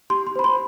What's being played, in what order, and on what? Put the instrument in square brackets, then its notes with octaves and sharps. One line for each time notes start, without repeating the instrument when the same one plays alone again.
[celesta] G4 C6
C6
C5 B5
C6